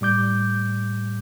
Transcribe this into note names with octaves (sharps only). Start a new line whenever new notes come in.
A2 G3 D6 G6